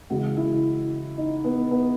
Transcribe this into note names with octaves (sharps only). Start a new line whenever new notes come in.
C#3 E3 G#3 F#4
E4
D#4
B3
B3